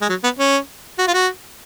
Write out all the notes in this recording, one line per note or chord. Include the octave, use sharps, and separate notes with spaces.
G#3
F#3
B3
C#4
F#4
F4
F#4